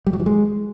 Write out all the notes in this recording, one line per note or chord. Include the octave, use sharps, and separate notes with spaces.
G3
F#3
E3
G#3